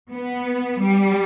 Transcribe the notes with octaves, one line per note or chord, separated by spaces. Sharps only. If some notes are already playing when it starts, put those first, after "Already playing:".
B3
G3